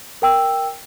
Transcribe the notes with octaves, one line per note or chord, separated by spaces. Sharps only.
A#4 G5 E6